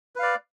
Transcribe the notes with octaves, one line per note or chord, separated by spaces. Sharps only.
B4 D5 F5